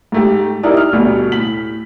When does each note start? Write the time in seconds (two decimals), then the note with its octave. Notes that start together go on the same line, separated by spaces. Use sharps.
0.12 G#2 A3 G4
0.63 D#4 E4 G4 A#4 D5
0.77 F6
0.93 D2 B2 G3 A3
1.32 A2 B6 F#7